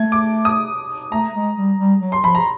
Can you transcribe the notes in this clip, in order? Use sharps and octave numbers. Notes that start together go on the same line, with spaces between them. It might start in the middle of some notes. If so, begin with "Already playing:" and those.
Already playing: A3 G#6
D6
D#6
A3 A#5
G#3
G3
G3
F#3
C6
F3 B5
A#5